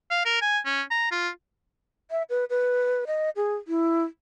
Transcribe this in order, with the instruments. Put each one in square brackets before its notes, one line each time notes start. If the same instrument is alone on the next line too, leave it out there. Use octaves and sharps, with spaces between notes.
[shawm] F5
A#4
G#5
C#4
A#5
F4
[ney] E5
B4
B4
D#5
G#4
E4